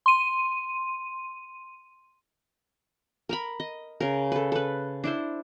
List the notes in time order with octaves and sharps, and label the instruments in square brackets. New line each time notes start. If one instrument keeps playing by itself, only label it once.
[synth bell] C6 D#7
[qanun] A#4 A#5 B5
D#5
C#3 A#4
A4 B4
A4 B4
D4 E4 C5